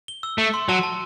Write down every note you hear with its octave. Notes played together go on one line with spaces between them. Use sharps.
G7
E6
A3 E6
C6
F#3 A5
A5